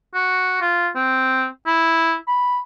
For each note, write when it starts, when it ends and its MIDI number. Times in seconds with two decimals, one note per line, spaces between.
0.14 0.60 66
0.61 0.88 65
0.95 1.46 60
1.66 2.15 64
2.28 2.60 83